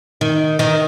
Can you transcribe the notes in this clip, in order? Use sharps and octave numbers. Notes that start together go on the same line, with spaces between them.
D#3
D#3